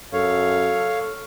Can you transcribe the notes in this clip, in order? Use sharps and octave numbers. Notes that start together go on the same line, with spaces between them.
F#2 A4 C#5 F5